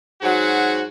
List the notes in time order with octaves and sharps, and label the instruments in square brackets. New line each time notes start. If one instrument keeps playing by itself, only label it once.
[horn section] G#2 F#3 F#4